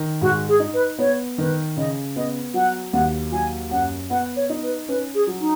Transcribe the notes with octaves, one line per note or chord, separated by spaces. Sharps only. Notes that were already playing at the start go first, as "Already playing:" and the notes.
Already playing: D#3
G#2 F#4
G#4
D#4
B4
B3 C#5
D#3 B4
C#3 D#5
B3 D#5
F#3 F#5
D#2 F#5
F#3 G#5
F#2 F#5
B3 F#5
C#5
D#4
B4
C#4 B4
G#4
F#3
D#4